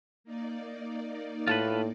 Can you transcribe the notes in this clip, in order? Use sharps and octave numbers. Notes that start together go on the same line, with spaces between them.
A#3 D#4 D5
A2 F4 A4 B4